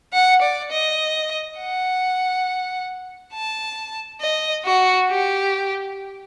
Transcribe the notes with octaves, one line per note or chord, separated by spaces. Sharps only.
F#5
D5
D#5
F#5
A5
D#5
F#4
G4